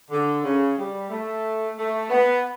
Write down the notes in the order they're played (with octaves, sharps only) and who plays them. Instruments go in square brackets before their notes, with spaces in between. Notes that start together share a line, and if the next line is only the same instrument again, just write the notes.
[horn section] D3
C#3
G3
A3
A3
B3